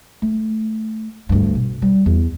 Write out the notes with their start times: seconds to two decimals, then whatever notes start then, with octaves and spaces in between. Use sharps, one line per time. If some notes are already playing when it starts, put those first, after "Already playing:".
0.22 A3
1.29 D2 G2
1.55 B2
1.82 G3
2.06 E2